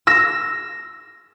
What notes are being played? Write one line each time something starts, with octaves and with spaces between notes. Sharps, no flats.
E6 A#6